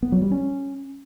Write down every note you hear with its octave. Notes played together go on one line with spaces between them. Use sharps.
B3
F#3
G3
C#4